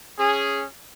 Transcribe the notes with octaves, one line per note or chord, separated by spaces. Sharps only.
C#4 G#4